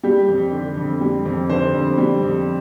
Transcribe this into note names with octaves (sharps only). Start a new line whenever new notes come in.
G3 G4
F2
D3
F2
G3
F2
D3 C5
F2
G3
F2